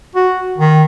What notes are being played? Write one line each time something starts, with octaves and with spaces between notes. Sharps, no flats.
F#4
D#3